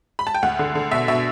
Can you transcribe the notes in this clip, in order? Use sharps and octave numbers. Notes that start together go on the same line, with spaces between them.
B5
A5
G5
D2 F#5
D3
D3
B2 E5
B2 E5